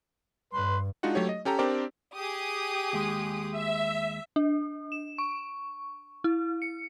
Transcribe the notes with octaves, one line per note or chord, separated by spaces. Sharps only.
G2 B4 C6
G#3 D4 D#4 F4 F#4 F#5
F#3 A3 G4 C#5
D#5
C#4 G4 A4 A#5
C4 D4 G4 A#4 C5 D5
G4 G#4 D#6
D#2 G#3
E5
D4
E7
C#6
E4
C#7